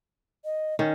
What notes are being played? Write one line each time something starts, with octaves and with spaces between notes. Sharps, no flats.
D#5
D#3 C#4